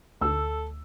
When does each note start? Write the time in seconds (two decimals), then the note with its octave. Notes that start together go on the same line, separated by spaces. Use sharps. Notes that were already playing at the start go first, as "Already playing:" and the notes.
0.21 D2 A4 E6